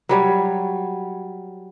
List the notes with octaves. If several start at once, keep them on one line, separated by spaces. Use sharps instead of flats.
F#3 G3 C#5